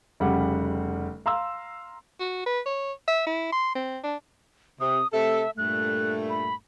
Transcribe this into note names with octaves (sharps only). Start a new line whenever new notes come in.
F1 C#3 G3 F#5
F5 A#5 C6 E6
F#4
B4
C#5
E5
E4
C6
C4
D4
C3 D#6
C3 A3 A4 E5
G2 A#2 A3 F#6
B5